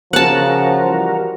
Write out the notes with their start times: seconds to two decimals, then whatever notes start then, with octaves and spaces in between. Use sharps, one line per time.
0.13 C#3 F3 F#4 A#4 F#5 A5
0.85 E3 G3